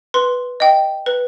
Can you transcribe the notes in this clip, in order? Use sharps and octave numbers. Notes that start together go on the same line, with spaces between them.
B4 C6
D#5 G5
B4